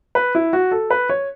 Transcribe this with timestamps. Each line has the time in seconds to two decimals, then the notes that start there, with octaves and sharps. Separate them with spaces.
0.15 B4
0.35 E4
0.53 F#4
0.71 A4
0.91 B4
1.10 C#5